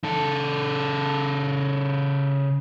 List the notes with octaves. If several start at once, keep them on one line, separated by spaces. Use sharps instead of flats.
C#3 A4